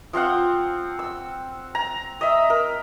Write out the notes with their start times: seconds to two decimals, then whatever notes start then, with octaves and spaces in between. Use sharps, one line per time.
0.13 F3 C4 F5 F#5
0.99 E6
1.75 A#5
2.21 D#5 E5
2.50 A#4